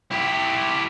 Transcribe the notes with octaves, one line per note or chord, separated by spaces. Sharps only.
E4 G4